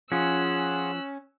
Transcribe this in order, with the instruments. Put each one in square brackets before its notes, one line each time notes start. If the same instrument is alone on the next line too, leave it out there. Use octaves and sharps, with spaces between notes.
[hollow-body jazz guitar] F3 [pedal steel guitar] C#4 [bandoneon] F4 G#4 F#5 [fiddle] E6 F#6